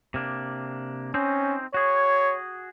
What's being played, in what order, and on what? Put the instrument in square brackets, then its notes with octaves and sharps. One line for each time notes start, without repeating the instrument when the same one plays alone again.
[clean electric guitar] C3 A#3 D4
[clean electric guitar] C4 D#4 C5 [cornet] C#4
[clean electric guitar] F#4 G#4 [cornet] C#5